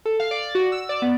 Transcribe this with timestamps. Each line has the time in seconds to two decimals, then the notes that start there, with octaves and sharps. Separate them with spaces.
0.05 A4
0.20 F5
0.31 D5
0.42 D5
0.55 F#4
0.72 E6
0.89 D5
1.02 B3